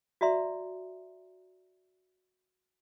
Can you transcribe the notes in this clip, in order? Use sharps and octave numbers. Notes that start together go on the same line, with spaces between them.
F#4 D5 E5 A#5 C6